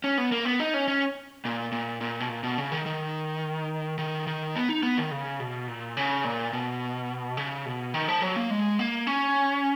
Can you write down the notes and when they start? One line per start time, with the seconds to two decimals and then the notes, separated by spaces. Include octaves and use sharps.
0.04 C#4
0.18 B3
0.32 A#3
0.45 B3
0.60 D#4
0.74 C#4
0.88 C#4
1.45 A#2
1.72 A#2
2.01 A#2
2.20 B2
2.29 A#2
2.43 B2
2.58 C#3
2.72 D#3
2.86 D#3
3.98 D#3
4.27 D#3
4.56 B3
4.69 D#4
4.83 B3
4.97 D#3
5.11 C#3
5.40 B2
5.68 A#2
5.97 C#3
6.24 A#2
6.53 B2
7.37 C#3
7.66 B2
7.94 D#3
8.08 F3
8.22 F#3
8.36 A#3
8.50 G#3
8.79 A#3
9.07 C#4